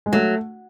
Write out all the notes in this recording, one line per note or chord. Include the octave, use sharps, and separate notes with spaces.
G#3
F#3 A3